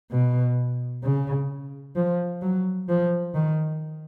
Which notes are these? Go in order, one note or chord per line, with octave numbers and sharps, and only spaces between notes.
B2
C#3
F3
F#3
F3
D#3